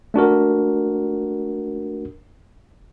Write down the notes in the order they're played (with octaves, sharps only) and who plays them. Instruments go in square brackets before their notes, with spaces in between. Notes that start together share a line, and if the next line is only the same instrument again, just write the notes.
[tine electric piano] A3 D4 F#4 A#4